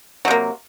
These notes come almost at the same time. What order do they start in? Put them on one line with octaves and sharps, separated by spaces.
F#3 C3 A#3